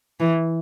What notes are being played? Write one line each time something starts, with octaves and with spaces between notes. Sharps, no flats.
E3